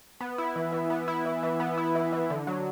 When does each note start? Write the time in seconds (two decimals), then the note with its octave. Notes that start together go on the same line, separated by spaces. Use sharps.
0.21 B3
0.38 E4
0.56 E3
0.72 E3
0.90 B3
1.08 E4
1.25 E3
1.43 E3
1.60 B3
1.77 E4
1.95 E3
2.13 E3
2.30 D3
2.47 F#3